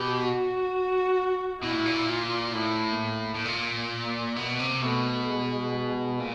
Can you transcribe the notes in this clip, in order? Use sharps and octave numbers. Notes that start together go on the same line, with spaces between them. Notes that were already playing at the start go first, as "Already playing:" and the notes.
Already playing: B2 G4
F#4
B2 E4
A#2
A2
A#2
F4
A2 E4
A#3
A2
A#2
B2
C3
B2 A3
G#3
A#2